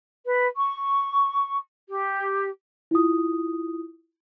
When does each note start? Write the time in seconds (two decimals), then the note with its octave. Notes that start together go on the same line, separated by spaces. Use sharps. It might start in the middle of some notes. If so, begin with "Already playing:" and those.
0.24 B4
0.57 C#6
1.88 G4
2.91 E4 F4 D#6